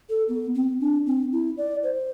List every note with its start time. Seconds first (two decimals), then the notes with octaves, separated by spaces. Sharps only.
0.09 A4
0.29 B3
0.55 C4
0.81 D4
1.06 C4
1.32 E4
1.58 D5
1.83 C5